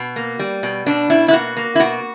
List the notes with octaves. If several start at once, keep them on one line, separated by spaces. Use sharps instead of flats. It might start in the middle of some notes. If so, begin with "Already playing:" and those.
Already playing: B2
A#3
G3
B2
B2 D4
B2 E4
E4
A#3 F#4
A#3
E4
B2 F#4